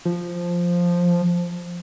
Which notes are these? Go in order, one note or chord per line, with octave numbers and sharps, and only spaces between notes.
F3